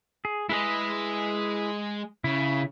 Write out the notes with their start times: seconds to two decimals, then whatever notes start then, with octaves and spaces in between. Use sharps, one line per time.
0.25 G#4
0.49 G#3 E4 G#4 B4 D#5
2.24 C#3 E4